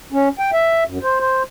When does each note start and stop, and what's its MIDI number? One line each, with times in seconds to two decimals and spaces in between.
0.12 0.29 61
0.39 0.51 79
0.53 0.84 76
0.87 0.98 42
1.03 1.20 72
1.20 1.43 72